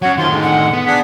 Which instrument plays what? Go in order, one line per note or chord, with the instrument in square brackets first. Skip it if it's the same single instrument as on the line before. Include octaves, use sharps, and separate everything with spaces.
[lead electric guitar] F#3 C#4 [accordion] F#4 C#5 [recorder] F#5
[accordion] F#2 F3 F4 [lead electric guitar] D#3 [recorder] C6
[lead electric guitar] A2 D#3 [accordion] D3 G#3
[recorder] F#5
[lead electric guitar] B3
[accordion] D4 G#4 F#5 [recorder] B6